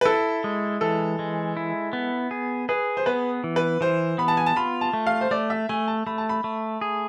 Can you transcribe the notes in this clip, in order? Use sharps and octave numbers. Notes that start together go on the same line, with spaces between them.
B4
E4 A4
G#3
E3 A4
G#3
E4
B3
G#4
G#4 B4
C5
B3 B4
E3
B4
E3 C5
B3 B5
A5
G#5
A5
F4 B5
A5
A3
F5
C5
A3 D5
E5
A3 G#5
A5
A3 B5
A5
B5
A3
G#4